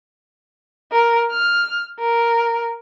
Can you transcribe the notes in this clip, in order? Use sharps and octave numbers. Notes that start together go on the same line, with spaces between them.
A#4
F6
A#4